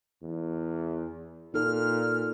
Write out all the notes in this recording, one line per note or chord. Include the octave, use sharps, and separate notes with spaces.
E2
A#2 D#4 A4 F6